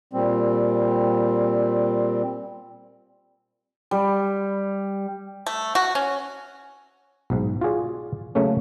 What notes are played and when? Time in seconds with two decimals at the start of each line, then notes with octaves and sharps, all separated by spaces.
0.13 A#2 G3 C4
3.91 G3
5.46 A3
5.75 F#4
5.95 C#4
7.30 B1 G#2
7.61 F4 F#4 G#4 D5
8.35 C#3 F#3 A3 A#3 C#4